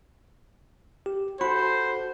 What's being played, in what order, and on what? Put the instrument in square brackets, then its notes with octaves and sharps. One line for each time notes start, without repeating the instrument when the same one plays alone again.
[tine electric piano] G4
[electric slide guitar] F#4 A4 [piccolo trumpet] C5 [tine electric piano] B5